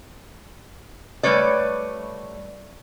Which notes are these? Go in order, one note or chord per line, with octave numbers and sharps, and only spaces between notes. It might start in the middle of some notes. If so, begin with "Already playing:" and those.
G3 A3 B4 C#5 D5